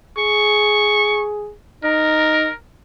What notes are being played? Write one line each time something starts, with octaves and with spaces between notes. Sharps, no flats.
G#4 C#6
D#4 A#4